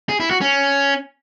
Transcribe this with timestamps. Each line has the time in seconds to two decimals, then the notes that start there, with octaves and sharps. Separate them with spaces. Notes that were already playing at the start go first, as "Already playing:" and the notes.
0.09 G#4
0.20 E4
0.31 F#4
0.41 C#4